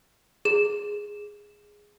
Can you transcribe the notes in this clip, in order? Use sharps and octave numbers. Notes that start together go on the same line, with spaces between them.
G#4 E7